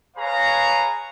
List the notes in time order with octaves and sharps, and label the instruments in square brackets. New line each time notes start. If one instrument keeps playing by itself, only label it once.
[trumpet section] G#4 B4 C#5 F5 A#5